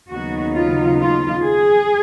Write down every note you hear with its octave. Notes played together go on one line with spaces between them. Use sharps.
D#2 C#3 F#3 B3 D#4 F#4
F4
F4
G#4